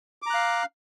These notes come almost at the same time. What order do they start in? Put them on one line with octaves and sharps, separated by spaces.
D6 A#5 F#6 F5